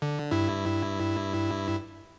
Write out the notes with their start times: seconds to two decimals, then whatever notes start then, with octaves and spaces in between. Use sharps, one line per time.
0.02 D3
0.31 G2 E4